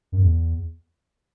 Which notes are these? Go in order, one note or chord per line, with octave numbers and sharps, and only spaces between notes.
F#2
E2